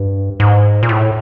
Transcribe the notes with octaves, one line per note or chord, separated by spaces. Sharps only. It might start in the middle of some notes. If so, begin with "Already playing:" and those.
Already playing: G2
G#2
A#2
A2